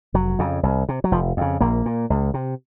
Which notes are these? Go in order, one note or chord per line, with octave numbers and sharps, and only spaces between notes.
F1 F#3
F2 C#3
C2
C3
F#3
F1 F3
F2 C#3
A#1 A#3
A#2
C#2
C3